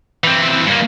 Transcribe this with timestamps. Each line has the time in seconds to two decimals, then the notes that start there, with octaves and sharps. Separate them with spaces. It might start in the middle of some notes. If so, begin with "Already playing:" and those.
0.24 E3 C4
0.66 G2 A#3